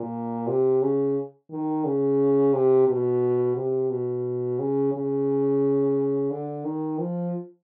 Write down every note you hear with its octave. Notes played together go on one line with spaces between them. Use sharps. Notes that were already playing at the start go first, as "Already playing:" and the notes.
Already playing: A#2
C3
C#3
D#3
C#3
C3
B2
C3
B2
C#3
C#3
D3
D#3
F3